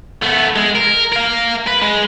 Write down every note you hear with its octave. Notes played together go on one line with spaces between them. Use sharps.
A3 B3
G#3
A#4
A#4 F5
B4
G#3